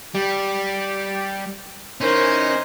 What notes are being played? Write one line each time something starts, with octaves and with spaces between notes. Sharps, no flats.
G3 G4
E3 C#4 D#4 A#4 C5